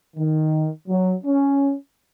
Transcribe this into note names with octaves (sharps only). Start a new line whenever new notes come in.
D#3
F#3
C#4